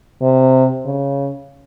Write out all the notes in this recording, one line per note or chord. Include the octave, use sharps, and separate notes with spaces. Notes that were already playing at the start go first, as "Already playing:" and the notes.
C3
C#3